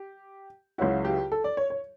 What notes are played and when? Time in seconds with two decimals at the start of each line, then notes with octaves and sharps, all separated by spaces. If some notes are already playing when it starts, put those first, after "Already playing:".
Already playing: G4
0.78 C#2 C#3 F#3 C#4 E4 F#4
1.05 G4
1.32 A4
1.44 D5
1.57 C#5
1.70 C#5